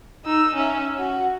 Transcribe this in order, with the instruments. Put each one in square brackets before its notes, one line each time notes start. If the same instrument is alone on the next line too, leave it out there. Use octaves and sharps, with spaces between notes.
[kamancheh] D#4 E6
C#4 E5
F#4